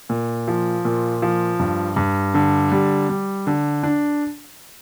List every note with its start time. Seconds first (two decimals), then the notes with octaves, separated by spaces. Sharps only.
0.10 A#2
0.48 F3
0.85 A#2
1.22 F3
1.60 G2
1.96 G2
2.34 D3
2.72 G3
3.09 G3
3.47 D3
3.83 D4